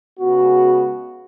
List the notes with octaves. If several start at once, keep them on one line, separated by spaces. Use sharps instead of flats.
C#3 G#3 B3 F#4